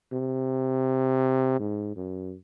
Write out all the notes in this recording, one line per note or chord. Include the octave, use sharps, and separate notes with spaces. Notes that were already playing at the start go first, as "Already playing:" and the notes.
C3
G#2
F#2